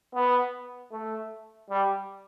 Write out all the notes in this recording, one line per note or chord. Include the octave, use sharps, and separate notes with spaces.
B3
A3
G3